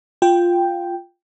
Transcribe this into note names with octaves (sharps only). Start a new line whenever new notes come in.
F4 G5